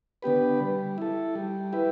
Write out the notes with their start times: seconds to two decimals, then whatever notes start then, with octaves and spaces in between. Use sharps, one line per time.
0.22 D3 B3 G4 B4
0.60 G3
0.98 E4 A4
1.35 G3
1.73 E4 G4 B4